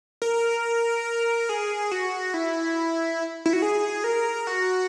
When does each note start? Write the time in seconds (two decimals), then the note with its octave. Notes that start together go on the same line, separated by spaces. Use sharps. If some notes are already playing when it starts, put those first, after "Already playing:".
0.22 A#4
1.49 G#4
1.91 F#4
2.34 E4
3.46 E4
3.53 F#4
3.62 G#4
4.04 A#4
4.47 F#4